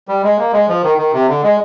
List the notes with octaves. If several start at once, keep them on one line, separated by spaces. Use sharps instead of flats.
G3
G#3
A#3
G#3
F3
D#3
D#3
C3
D3
G#3